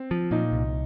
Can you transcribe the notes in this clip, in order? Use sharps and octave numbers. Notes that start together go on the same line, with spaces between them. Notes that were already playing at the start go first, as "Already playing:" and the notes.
Already playing: C4
F3
A#2 D#4
C2